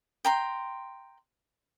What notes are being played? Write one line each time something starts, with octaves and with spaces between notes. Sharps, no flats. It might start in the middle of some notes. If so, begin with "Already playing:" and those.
G5 A#5 C6